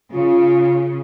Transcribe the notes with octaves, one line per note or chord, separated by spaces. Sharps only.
C#3 F4